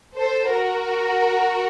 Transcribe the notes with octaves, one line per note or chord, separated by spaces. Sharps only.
A4 C5
F#4 A#4